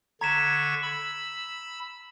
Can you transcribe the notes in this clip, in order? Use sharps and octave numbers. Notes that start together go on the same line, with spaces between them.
D3 A#5 C#6 G#6 B6 E7
B5 E6